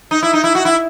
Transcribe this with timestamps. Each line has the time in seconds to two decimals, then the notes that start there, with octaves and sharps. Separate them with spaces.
0.11 D#4
0.23 E4
0.33 D#4
0.44 E4
0.55 F#4
0.65 E4